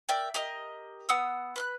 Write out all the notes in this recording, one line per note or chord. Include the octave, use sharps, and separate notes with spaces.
A#4 D5 E5 G5
G4 A#4 D#5
B3 F#5 D#6 E6
B4 F6 F#6